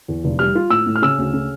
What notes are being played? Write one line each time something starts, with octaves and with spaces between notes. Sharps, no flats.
E2
F1
G3 F6
F4
A2 E6
A2
F6
C#3 E6
D2
C#3